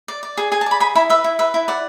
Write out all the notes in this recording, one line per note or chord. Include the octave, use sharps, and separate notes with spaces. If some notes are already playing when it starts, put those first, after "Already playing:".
D5
D5
G#4
G#4 G#5
A5
D5 B5
G#4 B5
E4 B5
B4 E5
E4
B4 E5
E4
D5 F#5